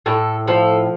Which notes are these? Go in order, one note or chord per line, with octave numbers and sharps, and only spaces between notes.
A2 A4
F3 A4